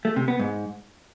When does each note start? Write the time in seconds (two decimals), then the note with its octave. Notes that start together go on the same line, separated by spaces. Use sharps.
0.05 A3
0.16 C3
0.28 B3
0.39 G#2